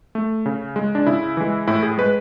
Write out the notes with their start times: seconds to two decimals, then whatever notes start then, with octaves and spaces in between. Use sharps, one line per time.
0.15 A3
0.46 C#3
0.76 G#3
0.95 D4
1.07 C#3 E4
1.37 E3 G#3
1.68 A2 E4
1.83 G#4
1.98 G#3 B4